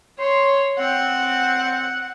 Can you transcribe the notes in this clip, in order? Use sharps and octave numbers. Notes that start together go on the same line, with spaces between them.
C#5 C6
C4 F#5